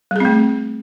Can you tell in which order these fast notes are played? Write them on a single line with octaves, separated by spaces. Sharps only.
G3 G#4 C4 A3